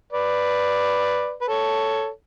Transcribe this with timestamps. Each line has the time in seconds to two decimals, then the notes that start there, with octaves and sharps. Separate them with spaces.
0.13 B4 D5
1.41 B4
1.48 A4 C#5